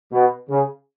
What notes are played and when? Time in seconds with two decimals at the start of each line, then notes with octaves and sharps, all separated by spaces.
0.12 B2
0.49 C#3